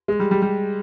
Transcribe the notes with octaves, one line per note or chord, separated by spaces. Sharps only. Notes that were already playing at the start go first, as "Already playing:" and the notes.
G#3
G3
G3
G3